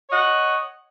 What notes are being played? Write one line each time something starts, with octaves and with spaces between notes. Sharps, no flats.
C#5 D#5 F#5